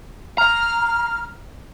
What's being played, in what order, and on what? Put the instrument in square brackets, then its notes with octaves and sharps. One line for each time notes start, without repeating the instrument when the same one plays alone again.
[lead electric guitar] A#5 [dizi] F6